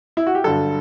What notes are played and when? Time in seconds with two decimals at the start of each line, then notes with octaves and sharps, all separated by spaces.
0.17 E4
0.27 F#4
0.35 G4
0.44 G2 D3 F#3 A4